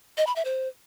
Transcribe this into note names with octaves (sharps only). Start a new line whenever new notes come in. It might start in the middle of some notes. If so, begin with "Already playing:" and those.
D#5
B5
E5
C5